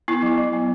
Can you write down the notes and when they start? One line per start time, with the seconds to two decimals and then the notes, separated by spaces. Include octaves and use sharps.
0.08 B3 E4
0.23 F#3
0.38 F#3
0.53 B3